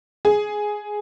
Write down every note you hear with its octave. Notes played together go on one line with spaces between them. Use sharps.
G#4